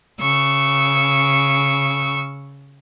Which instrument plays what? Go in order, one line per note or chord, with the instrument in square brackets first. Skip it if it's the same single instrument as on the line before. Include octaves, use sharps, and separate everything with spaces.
[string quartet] C#3 C#6 E6